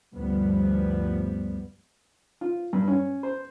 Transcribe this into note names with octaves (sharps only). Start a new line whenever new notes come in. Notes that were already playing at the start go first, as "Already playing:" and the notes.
D2 G2 F3 G3 B3
F4
G2
C#4
C5